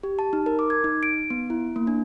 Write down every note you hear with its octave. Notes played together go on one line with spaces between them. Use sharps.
G4
A5
D#4
A#4
D6
G#6
D#4
D7
B3
E4
A#3
D4